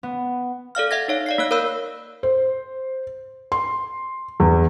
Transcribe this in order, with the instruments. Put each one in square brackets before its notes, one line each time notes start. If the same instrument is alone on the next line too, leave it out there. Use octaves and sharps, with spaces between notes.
[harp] B3
[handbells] A4 D5 F5 F6
E5 F#5 G#6 A#6
D#4 C#5 F5
D5 F5 C7
A#3 C#5 F#6
A#4 C#5 F5 B5 E6 G6
[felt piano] C5
C6
E2